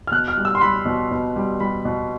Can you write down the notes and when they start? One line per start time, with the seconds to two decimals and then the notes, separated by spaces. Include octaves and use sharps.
0.07 F6
0.12 B2 F#6
0.28 F6
0.37 G3
0.45 E6
0.55 C6
0.61 G3 B5
0.86 B2
1.11 B2
1.36 G3
1.60 G3 B5
1.85 B2